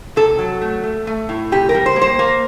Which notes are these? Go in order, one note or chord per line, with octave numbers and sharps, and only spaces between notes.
C3 A4
F#3
A3
A3
A3
A2
C3 G4
A#4
G3
C5
A#3
C5
A#3